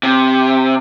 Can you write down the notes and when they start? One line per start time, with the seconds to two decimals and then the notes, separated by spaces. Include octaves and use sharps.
0.03 C3